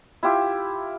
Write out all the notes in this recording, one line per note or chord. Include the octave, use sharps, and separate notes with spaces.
E4 F4 G4